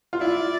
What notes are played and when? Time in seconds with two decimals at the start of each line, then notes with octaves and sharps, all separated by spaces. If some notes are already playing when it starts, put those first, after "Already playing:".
0.13 F4
0.21 E4 D5